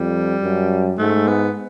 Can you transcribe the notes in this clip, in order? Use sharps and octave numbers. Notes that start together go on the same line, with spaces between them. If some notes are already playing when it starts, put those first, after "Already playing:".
Already playing: F2 G3
F#2
G#2 A3
B3